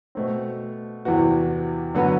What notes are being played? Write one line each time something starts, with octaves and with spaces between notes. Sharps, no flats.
B2 A3 C4
E2 C3 E3 B3 F#4
D3 F#3 B3 F#4 B4